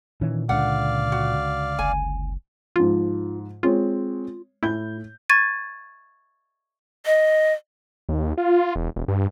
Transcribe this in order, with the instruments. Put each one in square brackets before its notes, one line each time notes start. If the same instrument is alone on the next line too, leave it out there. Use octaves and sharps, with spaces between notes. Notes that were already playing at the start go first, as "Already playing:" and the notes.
[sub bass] A#2 [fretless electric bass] D#3 E3 C#4
[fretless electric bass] C#2 D3 [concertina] D5 F5 [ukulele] F#5
[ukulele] F#4
[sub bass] F#1 [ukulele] G#5
[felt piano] G#2 F3 [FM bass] F4
[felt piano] G#3 C4 C#5 [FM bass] F4
[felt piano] A2 G6 [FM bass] E4
[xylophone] C#6 G#6 A6 D#7
[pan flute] D#5
[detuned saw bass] D#2
F4
E1
E1
G2